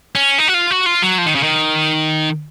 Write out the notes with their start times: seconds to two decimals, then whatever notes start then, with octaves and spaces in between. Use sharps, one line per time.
0.15 C#4
0.38 D#4
0.48 F#4
0.54 F4
0.71 F#4
0.86 F4
1.02 F#3
1.18 F3
1.26 D#3
1.35 C#3
1.43 D#3